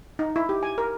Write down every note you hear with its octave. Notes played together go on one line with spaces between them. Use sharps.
D#4
E4
G4
G#5
A#4